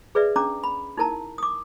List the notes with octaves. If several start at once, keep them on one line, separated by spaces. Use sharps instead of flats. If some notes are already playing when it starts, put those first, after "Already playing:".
G#4 B4 D5 E5
C#4 D4 A#5 D6
B5
D#4 E4 A#4 A5 A#5
D6 D#6